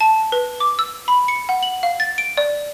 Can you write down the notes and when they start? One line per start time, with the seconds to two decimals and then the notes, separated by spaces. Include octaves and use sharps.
0.01 A5
0.32 B4
0.60 D6
0.79 E6
1.08 B5
1.28 C#7
1.49 F#5
1.63 F#7
1.83 F5
2.00 A6
2.18 D7
2.37 D5